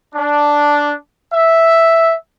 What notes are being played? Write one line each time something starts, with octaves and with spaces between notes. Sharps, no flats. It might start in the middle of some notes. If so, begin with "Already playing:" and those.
D4
E5